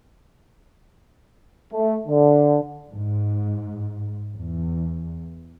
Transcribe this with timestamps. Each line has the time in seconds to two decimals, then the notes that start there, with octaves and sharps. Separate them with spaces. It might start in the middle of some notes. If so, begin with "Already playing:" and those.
1.72 A3
2.07 D3
2.90 G#2
4.35 E2